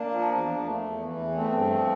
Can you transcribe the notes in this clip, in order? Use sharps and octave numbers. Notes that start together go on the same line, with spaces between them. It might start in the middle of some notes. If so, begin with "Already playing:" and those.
Already playing: A#3 D4
F3
E2
F3
A3
E2
E3
E2
A3 C4
G2
F3